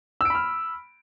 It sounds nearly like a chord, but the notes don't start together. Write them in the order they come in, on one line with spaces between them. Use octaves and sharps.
E6 D7 B5 F6